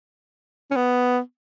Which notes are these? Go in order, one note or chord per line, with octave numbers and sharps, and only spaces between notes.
C#4
B3